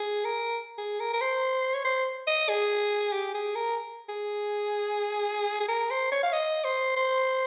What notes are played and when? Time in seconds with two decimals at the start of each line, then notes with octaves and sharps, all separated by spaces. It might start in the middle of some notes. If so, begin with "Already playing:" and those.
Already playing: G#4
0.25 A#4
0.78 G#4
1.00 A#4
1.13 A#4
1.21 C5
1.74 C#5
1.84 C5
2.27 D#5
2.49 G#4
3.12 G4
3.34 G#4
3.55 A#4
4.09 G#4
5.60 G#4
5.68 A#4
5.90 C5
6.11 C#5
6.23 F5
6.33 D#5
6.64 C5
6.96 C5